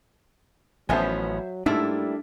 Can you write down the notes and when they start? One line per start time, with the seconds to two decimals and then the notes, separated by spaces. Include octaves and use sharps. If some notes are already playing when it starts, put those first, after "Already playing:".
0.89 A1 F3 F#3 B3 C#4 C5 E5 G#5
1.66 G#2 G3 A3 A#3 D4 E4